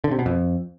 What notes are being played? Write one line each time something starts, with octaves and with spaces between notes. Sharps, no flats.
D3
C3
B2
F2